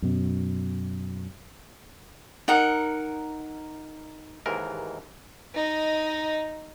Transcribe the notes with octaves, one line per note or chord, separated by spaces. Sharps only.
F#2 B2
D#4 A#4 F#5
D#2 G#2 E3 A#4
D#4 D#5